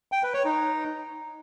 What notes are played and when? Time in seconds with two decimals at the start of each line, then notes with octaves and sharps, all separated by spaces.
0.12 G5
0.23 B4
0.34 C#5
0.45 D#4